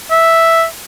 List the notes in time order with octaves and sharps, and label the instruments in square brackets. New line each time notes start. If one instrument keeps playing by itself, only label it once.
[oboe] E5